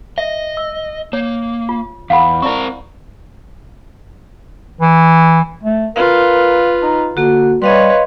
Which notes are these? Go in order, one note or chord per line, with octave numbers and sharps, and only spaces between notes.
D#5 E5
E6
A#3 C#5
F4
E2 F5 F#5 B5
C4 E4 A#4 D5 C#6
E3
A3
F4 A#4 B4 F5
D#4
D3 A#3 F#4
G3 B4 C#5 D#5 F5 C6